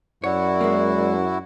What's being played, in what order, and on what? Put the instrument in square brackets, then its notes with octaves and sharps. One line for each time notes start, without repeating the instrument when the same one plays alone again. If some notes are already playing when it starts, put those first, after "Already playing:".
[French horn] F#2 [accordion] E4 F#4 [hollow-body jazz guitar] C#5 [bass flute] D5
[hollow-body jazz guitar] G#3 A#3